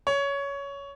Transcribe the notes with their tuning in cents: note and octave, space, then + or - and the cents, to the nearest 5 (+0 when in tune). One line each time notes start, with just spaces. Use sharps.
C#5 +15